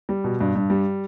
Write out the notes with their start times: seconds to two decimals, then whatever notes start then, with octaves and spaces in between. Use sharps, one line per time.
0.09 G3
0.24 B2
0.41 G2
0.55 G2
0.70 G3